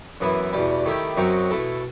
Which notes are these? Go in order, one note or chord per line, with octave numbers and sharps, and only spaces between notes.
F#2 E3 B3 E4
E2 B2 G3
D#3 A3 E4 G4
F#2 F#3 C4 D#4 F#4
B2 A3 E4 A4